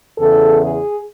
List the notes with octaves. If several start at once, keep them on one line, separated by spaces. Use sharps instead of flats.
E2 C#3 E3 A4
G#4